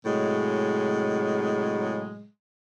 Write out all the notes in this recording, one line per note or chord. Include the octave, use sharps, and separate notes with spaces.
A2 C3 F#3 G#3